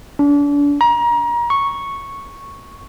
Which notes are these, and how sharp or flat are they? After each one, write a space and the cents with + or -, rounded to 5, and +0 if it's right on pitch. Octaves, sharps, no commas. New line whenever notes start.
D4 -35
A#5 +30
C#6 -5